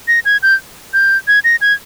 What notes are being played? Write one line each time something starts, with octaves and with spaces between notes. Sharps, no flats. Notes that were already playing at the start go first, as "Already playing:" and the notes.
A#6
G#6
G6
G6
G#6
A#6
G#6